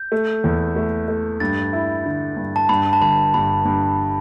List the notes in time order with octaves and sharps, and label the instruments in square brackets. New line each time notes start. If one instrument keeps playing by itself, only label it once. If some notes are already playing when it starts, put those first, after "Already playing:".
Already playing: [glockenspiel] G6
[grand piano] A3
E2
A3
A3
[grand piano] G2 [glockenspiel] A6
[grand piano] E4
D3
G2
[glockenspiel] A5
[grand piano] G2 [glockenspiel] B5
[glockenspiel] A5
[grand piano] G1 [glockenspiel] B5
[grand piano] G2 [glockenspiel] B5
[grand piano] G2